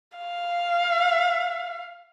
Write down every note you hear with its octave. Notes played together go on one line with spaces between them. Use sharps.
F5